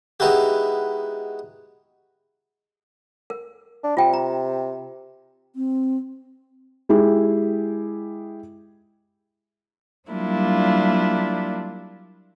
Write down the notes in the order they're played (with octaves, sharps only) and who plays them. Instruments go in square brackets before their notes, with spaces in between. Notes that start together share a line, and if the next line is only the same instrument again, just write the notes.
[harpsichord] G#3 B3 D#4 E4 F#4 G4
[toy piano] A#4
[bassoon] D4
[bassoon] C3 [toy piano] F4 G5
[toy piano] A#5
[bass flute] C4
[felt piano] G#3 E4 G4 G#4
[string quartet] F#3 G3 A#3 D4 E4 F4